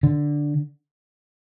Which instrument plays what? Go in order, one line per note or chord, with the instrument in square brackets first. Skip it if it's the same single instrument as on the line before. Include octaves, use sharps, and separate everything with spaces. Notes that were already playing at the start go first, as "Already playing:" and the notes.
[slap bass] D3